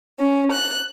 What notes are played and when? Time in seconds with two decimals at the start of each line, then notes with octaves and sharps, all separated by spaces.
0.19 C#4
0.53 F#6